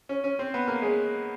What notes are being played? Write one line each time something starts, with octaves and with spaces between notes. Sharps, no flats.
C#4
C#4
C4
B3
A#3
G#3